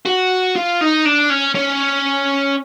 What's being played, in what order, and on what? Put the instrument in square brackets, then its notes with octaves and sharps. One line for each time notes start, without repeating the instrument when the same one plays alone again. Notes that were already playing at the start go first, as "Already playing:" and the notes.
[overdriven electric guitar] F#4
F4
D#4
D4
C#4
C#4